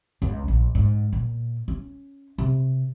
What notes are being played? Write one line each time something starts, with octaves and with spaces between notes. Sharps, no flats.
C#2
A#1
G#2
A#2
C#4
C3